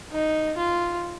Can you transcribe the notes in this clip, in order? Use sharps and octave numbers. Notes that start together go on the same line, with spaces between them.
D#4
F4